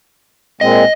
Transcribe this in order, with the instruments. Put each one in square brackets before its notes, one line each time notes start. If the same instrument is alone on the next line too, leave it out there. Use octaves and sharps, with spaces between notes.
[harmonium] A#2 G#3 C4 [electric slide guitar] D#5